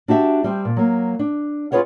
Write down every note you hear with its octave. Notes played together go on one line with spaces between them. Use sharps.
D4 F#4 G4 E5
G3 C4
A#2
F#3 A#3
D4
F4 G#4 B4 C#5 F#5